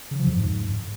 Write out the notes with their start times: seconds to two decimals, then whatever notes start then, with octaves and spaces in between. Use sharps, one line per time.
0.11 C#3
0.19 F3
0.27 F2
0.35 G#2